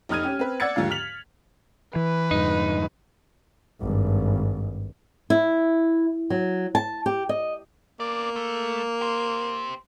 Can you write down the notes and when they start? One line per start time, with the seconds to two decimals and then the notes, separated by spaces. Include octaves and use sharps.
0.09 F1 D#4 D#6 F6 G#6 D#7
0.23 C#4 G4
0.39 C4 B4
0.60 D5 F#5 E6 G#6 A6 C#7
0.76 D#2 G#2 D3 F3 F5
0.91 F6 B6 F7 F#7
1.96 E3 B4
2.31 F2 G#2 D3 D#4
3.81 G#1 G2
5.30 E4
6.30 F#3
6.75 A5
7.06 G4
7.29 D#5
8.00 A#3 B3 D5
8.36 A3
9.01 G4 C5